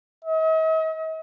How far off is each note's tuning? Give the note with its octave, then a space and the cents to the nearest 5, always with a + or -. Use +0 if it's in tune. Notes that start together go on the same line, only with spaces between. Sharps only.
D#5 +45